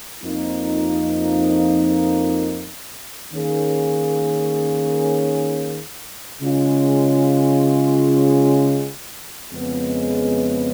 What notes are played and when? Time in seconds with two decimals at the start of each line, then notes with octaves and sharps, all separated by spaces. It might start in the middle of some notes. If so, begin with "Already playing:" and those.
0.22 F2 F3 A#3 D#4
3.32 D#3 A#3 C#4 G#4
6.42 C#3 G#3 C#4 F4
9.52 F2 C#3 G#3 B3